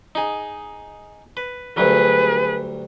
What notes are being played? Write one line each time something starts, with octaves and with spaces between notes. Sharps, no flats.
D#4 G#4
B4
D2 G2 F#3 G#4 B4